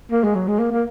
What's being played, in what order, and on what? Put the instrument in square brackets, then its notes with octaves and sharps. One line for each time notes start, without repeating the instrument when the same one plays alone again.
[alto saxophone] A#3
G#3
F#3
G#3
A#3
A#3